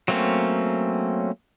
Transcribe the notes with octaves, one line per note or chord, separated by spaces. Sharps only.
F#3 A3 A#3 C4 C#4